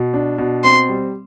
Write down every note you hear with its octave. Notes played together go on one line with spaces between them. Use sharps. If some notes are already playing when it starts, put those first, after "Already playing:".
Already playing: B2
D4
B2
C4 C6
G3